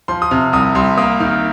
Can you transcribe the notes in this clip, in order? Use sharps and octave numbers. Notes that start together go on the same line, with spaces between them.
F3 C6
D#6
C3 F6
C2 D#6
C2 C6
A#3 D#6
D#3 F6